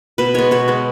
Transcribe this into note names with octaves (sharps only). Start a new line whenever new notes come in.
B2 B4
G#3 B3 C#5
B2 C#5
G#3 B3